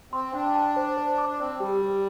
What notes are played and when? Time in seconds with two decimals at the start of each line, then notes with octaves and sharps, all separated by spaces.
0.13 C4 C6
0.34 D4 G5
0.55 A5
0.76 C5
0.97 C5
1.18 D6
1.29 D4
1.40 C4 D5
1.60 G3 G4
1.82 G4